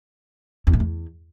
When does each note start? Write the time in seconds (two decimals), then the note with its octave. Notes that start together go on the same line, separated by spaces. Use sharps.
0.67 E2
0.73 A2
0.80 E2